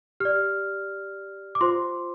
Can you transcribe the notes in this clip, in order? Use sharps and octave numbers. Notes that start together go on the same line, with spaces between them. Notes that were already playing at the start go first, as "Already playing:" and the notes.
G4 D5 F6
D6
F4 C5 C6